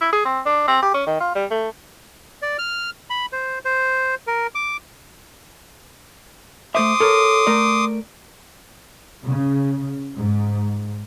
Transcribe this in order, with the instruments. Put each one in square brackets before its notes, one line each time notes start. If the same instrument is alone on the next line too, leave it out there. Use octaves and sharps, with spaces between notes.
[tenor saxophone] E4
G#4
C4
D4
C4
G4
C#4
D#3
F4
G3
A3
[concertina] D5
F6
B5
C5
C5
A#4
D6
[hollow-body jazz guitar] A3 C5 E5 [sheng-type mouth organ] C6 D6 D#6
[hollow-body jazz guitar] A4 A#4 C#5
A3 A#4 D5
[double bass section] C#3
G#2